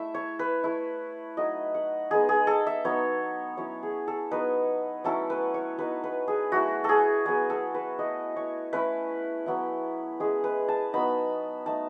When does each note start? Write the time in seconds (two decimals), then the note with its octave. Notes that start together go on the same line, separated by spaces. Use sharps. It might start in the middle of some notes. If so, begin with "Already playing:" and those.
Already playing: A3 E4 E5
0.14 C#5
0.39 B4
0.64 A3 E4
1.37 F#3 A3 D#4 D#5
1.75 F#5
2.11 G#3 B3 D#4 G#4
2.29 G#4
2.47 A4
2.67 E5
2.84 F#3 B3 D#4 C#5
3.57 F#3 C#4 E4 C#5
3.83 G#4
4.07 A4
4.31 F#3 B3 D#4 B4
5.04 F#3 A3 C#4 E4 A4
5.30 B4
5.54 C#5
5.78 F#3 B3 D#4 B4
6.04 B4
6.28 G#4
6.52 F#3 A3 E4 F#4
6.84 G#4 A4
7.26 F#3 B3 E4 G#4
7.50 A4
7.75 B4
7.99 A3 E4 D#5
8.36 C#5
8.73 A3 C#4 E4 B4
9.46 F#3 B3 E4
10.20 G#3 C#4 E4 G#4
10.44 B4
10.68 A5
10.93 F#3 B3 D#4 B5
11.66 A3 D#4 A5